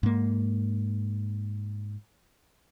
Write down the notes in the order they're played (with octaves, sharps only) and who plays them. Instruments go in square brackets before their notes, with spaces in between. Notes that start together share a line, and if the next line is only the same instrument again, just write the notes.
[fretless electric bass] G#2 A#3